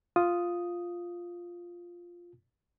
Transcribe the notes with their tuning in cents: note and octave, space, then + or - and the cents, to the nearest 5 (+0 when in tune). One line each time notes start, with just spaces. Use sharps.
F4 +0 D#6 +0